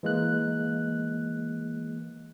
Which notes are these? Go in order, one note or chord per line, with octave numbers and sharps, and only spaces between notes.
E3 G#3 A#3 F#6